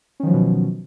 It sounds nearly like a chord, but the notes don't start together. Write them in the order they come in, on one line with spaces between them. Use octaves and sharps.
C#4 D#3 F3 F#3 B2